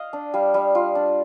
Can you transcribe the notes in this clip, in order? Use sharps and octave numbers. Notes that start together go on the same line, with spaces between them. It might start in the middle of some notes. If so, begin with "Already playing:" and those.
Already playing: D#5 F5
D4
G3 F5
G3
F4
D4